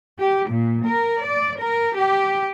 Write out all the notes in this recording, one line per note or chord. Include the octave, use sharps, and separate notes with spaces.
G4
A#2
A#4
D5
A#4
G4